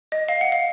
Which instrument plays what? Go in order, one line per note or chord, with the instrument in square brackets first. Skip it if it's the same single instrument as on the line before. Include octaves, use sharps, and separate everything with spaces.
[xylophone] D#5
F5
F#5
F5